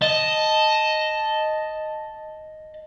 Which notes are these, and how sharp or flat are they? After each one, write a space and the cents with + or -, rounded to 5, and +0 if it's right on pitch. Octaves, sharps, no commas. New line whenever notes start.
D#5 +0 A5 +0